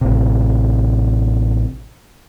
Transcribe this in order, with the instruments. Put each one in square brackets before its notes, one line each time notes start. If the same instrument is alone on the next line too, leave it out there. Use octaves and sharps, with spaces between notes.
[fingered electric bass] A1 C3